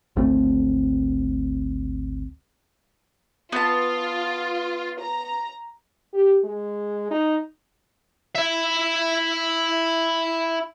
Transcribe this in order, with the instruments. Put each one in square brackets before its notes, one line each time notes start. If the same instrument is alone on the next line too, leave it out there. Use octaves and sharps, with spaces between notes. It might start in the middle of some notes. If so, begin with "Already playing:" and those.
[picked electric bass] G#1 D2 A3 C4
[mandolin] B3 A5 [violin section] F4
[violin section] A#5
[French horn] G4
G#3
D#4
[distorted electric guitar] E4 E5